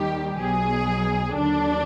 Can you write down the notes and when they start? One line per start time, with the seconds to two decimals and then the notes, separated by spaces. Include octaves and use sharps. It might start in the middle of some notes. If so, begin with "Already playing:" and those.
Already playing: D#2 D#3 G3 G4
0.39 B1 B2 F#3 G#4
1.35 D#2 D3 F#3 D4